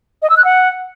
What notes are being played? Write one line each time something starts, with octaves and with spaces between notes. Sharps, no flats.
D#5
E6
F#6
F#5